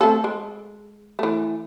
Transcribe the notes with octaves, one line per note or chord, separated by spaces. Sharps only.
A3 C4 A4
G#3
E3 A3